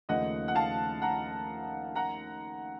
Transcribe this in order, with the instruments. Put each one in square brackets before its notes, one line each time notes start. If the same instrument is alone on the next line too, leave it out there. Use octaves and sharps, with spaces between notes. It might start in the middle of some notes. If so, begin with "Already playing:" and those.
[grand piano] D#2 C#3 F3 A3 D#4 [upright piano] D#5 F#5
[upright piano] F#5
F5 A5
F#5 A#5
F#5 A#5